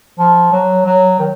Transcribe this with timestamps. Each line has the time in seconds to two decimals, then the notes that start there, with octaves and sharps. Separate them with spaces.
0.19 F3
0.53 F#3
0.86 F#3
1.19 D#3